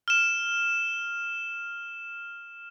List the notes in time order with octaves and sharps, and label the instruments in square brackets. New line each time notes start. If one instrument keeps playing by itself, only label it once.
[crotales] F6 E7